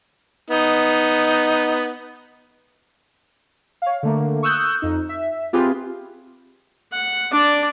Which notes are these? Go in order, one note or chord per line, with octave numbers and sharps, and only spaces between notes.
B3 D#4
C#5 F5
D3 A3 A#3
C#6 D#6 E6 F#6 G6
F2 D#4
E5
C4 F4 G4 G#4 B4
F#5
D4 D5